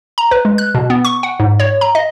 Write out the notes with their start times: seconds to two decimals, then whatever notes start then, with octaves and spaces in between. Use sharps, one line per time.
0.18 A#5
0.31 B4
0.45 G#3
0.58 F#6
0.75 B2
0.90 B3
1.05 C#6
1.23 F#5
1.40 G#2
1.60 C#5
1.81 A#5
1.95 D#5